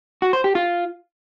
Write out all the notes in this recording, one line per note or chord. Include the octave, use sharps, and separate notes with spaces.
F#4
C5
G4
F4